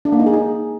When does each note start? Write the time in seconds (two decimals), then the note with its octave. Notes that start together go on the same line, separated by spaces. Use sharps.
0.05 D4
0.12 A#3
0.19 D#4
0.26 G#4
0.33 D#4